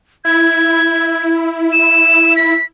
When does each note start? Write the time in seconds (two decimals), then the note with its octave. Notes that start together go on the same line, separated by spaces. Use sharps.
0.25 E4 G#6
1.72 E7
2.36 B6